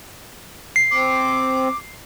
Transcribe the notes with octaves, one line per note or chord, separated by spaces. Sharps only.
C7
C4 D6